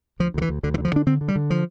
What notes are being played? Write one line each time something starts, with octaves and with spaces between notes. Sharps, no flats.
D2 F3
D2 D3
E3
D2
D2 D3
E3
D3
F3
D3 D4
D3 C4
D3
G3
D3
F3